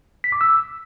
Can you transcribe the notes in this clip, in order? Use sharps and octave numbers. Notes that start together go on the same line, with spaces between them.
B6
D6
E6